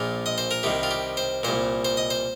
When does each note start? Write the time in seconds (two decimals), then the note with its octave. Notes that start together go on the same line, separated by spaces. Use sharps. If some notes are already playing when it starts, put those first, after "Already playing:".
Already playing: A#1 A#2 F4
0.26 D#5
0.38 C5
0.51 A#4
0.63 C2 C3 D#3 G4
0.83 F4
0.91 G4
1.17 C5
1.43 C2 A#2 C5
1.85 C5
1.97 D#5
2.10 C5